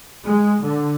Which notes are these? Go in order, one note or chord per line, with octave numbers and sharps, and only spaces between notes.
G#3
D3